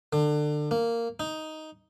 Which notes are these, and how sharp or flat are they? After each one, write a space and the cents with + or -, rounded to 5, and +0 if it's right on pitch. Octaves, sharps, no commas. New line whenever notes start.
D3 +25
A#3 -10
D#4 +5